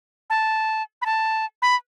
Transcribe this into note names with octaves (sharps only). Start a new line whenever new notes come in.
A5
B5
A5
B5